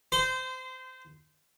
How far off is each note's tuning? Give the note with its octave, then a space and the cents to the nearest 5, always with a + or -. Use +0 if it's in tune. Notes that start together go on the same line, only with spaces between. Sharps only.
C5 -20 C6 -30